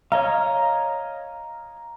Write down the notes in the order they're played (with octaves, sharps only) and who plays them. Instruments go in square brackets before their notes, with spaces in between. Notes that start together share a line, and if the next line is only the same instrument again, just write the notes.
[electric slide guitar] C#5 D#5 F5 [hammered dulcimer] A#5